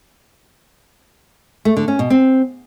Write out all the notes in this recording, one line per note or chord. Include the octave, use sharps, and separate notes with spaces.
A3
D3
C#4
B2
C4